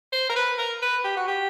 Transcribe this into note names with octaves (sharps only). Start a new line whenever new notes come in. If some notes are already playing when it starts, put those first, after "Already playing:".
C5
A#4
B4
A#4
B4
G4
F#4
G4